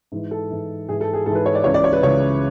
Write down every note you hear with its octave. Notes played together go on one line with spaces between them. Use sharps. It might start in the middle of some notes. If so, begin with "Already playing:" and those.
G#2 E3
A4
G#2 E3
G#2 E3 G#4
A4
G#4
G#2 E3 A4
B4
C#5
D5
C#2 C#3 E3 C#5
D5
C#5
B4
C#2 C#3 E3 C#5